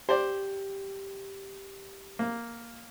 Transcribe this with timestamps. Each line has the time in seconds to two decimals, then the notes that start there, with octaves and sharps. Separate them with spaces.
0.09 G4 C5 D5
2.19 A#3